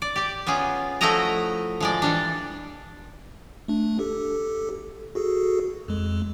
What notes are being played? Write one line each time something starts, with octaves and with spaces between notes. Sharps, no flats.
D5
G4 D5
B3 C#4 F4 G#4
F3 A3 E4 F#4 D#5 A#5
F3 G#3 D5
E3 G3 D4
A3 D4
G4 A4
F#4 G#4 A4
F2 G#3